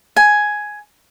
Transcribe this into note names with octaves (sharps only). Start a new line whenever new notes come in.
G#5